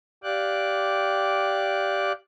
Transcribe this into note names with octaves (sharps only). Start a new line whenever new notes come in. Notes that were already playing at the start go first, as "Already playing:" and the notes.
G4 D5 F5 G5 D6 F#6